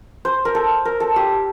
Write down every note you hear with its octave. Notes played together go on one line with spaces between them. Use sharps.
C5
A#4
A4
A#4
A4
G4